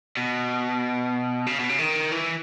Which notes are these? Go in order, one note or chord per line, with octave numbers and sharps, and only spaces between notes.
B2
C#3
B2
C#3
D#3
E3